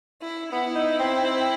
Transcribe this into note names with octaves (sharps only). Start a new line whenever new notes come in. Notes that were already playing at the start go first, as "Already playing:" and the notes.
E4
B3 E4
D#4
C4
C4